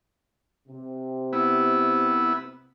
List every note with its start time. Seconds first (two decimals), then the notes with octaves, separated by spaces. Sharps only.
0.68 C3
1.33 B3 E4